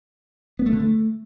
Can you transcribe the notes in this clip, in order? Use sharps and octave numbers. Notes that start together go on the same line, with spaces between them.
B3
A3
D3
A3